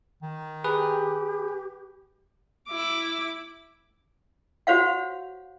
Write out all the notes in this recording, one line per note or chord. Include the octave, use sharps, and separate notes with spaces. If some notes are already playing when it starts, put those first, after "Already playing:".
D#3
G4 G#4 B4
E4 D6
F#4 G4 C5 C#5 F5 F#5